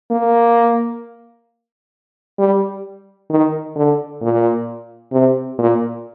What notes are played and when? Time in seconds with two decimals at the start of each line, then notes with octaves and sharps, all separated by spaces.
0.11 A#3
2.39 G3
3.31 D#3
3.76 D3
4.22 A#2
5.12 C3
5.58 A#2